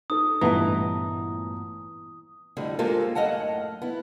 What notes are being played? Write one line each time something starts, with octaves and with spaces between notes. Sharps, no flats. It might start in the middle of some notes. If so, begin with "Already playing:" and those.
D#4 A4 D#6
A1 G2 A#2 E3 B3 D#5 A5 A#5
F2 A2 D3 G3
G#3 A#3 F4 G4 A4 C5
F#2 A2 D#5 F5 F#5 A5
B3 E4